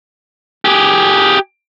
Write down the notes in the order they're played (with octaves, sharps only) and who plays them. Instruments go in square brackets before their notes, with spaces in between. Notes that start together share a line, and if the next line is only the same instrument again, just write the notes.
[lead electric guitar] G4 G#4